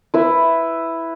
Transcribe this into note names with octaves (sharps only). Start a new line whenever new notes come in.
E4 B4 E5